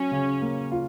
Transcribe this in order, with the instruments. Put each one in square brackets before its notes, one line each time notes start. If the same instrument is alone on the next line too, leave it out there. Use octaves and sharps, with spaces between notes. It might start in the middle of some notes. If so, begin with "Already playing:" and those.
Already playing: [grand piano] F#3 [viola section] C#4
[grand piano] C#3
A#3
F4